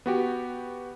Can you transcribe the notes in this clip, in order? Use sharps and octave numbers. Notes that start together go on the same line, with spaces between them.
B3 F#4 G4